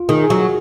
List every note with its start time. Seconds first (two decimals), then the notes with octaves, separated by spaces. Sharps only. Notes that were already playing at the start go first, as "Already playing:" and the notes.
Already playing: F4
0.09 D#3 G#4
0.24 G#4
0.30 F#3 F#4